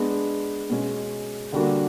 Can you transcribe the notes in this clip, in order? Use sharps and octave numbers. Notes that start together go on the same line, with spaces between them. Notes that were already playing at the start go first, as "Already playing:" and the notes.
Already playing: G#3 B3 D4
B2 G#3 C#4
D3 G3 A#3 D4 F#4